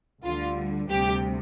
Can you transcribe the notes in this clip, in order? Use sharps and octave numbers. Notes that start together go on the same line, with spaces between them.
D2 D3 G3 F4
D2 C3 G3 G4